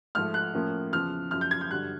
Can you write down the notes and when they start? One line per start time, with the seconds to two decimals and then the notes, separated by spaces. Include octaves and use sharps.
0.15 G#2 F3 A3 F6
0.34 F#6
0.54 A2 F3 A#3 C#4
0.93 E2 C#3 F3 F6
1.31 F#2 C#3 F3 F6
1.41 G6
1.51 G#6
1.61 G6
1.70 G2 D3 F#3 F#6